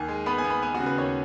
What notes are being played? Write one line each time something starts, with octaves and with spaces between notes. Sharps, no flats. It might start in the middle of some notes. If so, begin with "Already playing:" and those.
Already playing: D#2 G#5
G#3
B3 B5
G#5
B3
B5
B3 G#5
F#4
C#3
B4
D#2 C#5